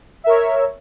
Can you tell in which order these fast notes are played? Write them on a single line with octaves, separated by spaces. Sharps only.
E5 A#4 C#5